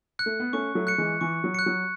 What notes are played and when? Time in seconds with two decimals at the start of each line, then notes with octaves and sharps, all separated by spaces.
0.19 F#6 C#7
0.26 A3
0.40 B3
0.53 A3 C#4 C#6
0.75 F#3 A3
0.87 F#6 C#7
0.98 E3 G#3
1.21 E3 C#6
1.44 F#3
1.54 F#6 C#7
1.66 F#3